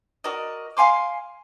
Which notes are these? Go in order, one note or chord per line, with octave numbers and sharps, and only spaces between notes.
F#4 A#4 D5 D#5
F5 G#5 C6 D6